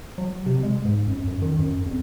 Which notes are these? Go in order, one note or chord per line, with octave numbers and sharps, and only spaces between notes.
F#3
C3
G#3
G#2
F#2
F#2
D#3
F#2
F2